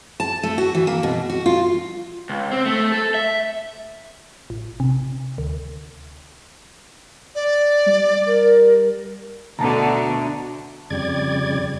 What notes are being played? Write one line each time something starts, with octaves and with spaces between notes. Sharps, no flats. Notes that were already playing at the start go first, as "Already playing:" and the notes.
A5
A3
F#4
E3
A#3
B2
F#4
F4
C#2
C4
A3
A4
E5
A1
C3
D2
D5
G3
A#4
D2 B2 D3 A5 A#5
F2 C#3 G3 D5 G#6